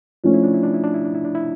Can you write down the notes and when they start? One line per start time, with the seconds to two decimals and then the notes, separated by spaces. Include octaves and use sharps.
0.24 F3 A3 C#4 D4
0.34 E4
0.43 D4
0.54 E4
0.63 D4
0.74 E4
0.84 D4
0.94 E4
1.04 D4
1.14 E4
1.24 D4
1.35 E4